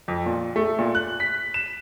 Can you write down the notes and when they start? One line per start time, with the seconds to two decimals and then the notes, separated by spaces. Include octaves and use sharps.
0.08 F2
0.26 A#2
0.56 A3
0.79 A#2
0.95 F#6
1.20 B6
1.54 E7